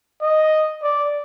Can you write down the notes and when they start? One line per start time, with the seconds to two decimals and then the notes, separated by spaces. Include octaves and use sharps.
0.22 D#5
0.83 D5